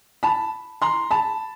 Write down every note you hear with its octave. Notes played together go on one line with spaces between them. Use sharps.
A5 B5
A#5 C6
A5 B5